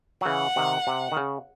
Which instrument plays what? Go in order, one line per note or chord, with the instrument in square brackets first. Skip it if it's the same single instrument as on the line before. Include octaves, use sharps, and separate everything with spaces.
[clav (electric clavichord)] F#3
[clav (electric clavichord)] C#3 E3 [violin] F#5
[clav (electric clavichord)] C3 D#3
C3
D#3
C#3